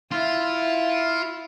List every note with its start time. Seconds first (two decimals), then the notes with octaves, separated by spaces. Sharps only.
0.11 E4 F4